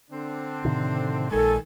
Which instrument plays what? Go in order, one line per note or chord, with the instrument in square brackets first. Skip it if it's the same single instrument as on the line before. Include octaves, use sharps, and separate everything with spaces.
[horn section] D3 C4 D4
[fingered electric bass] A2 C3 D#3
[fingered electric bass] A#1 G#3 [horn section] D#3 G#5 [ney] A4